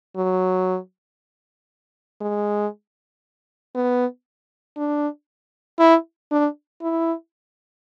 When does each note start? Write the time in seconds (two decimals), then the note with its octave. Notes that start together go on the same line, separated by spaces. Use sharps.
0.16 F#3
2.21 G#3
3.75 B3
4.77 D4
5.79 E4
6.31 D4
6.82 E4